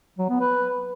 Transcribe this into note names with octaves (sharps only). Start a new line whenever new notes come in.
F#3
B3
B4